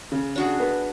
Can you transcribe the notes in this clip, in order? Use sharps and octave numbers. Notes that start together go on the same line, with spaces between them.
C#3
D4 F#4 G#4
B3